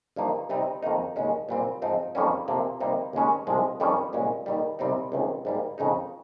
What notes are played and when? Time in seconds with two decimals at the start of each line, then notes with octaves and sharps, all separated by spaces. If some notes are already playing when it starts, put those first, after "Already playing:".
0.16 G2 F3 A#3 D#4
0.49 C3 G3 C4 D#4
0.83 F2 D#3 A#3 D#4
1.16 D#2 C#3 G#3 C#4
1.49 A#2 G3 C4
1.82 G#2 F3 C4 D#4
2.15 F2 D#3 G3 A#3 C#4
2.48 F2 C3 F3 A#3
2.80 C3 G3 A#3 D#4
3.13 D#2 C#3 G#3 C#4
3.47 C2 C3 F3 G#3
3.80 F2 D#3 G3 C#4
4.13 C2 A#2 G#3 C#4
4.46 D#2 D#3 G3
4.79 C2 C3 G3 C4 D#4
5.12 C#2 C3 D#3
5.45 G#2 G3 A#3
5.78 F2 C#3 G#3 D#4